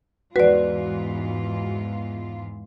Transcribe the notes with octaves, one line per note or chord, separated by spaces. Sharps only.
E2 G#2 F4 F#4 B4 D5